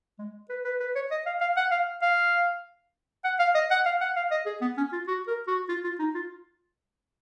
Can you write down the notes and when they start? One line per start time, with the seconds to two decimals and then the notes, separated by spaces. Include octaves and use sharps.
0.19 G#3
0.50 B4
0.65 B4
0.80 B4
0.95 C#5
1.11 D#5
1.26 F5
1.41 F5
1.57 F#5
1.71 F5
2.02 F5
3.25 F#5
3.39 F5
3.55 D#5
3.71 F#5
3.86 F5
4.01 F#5
4.16 F5
4.31 D#5
4.46 G#4
4.61 B3
4.77 C#4
4.93 F4
5.08 F#4
5.27 A#4
5.48 F#4
5.69 F4
5.84 F4
5.99 D#4
6.15 F4